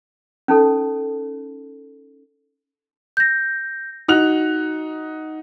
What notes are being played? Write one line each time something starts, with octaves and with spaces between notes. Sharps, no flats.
C#4 D#4 A4
G6 A#6
D#4 F#4 F#6 F7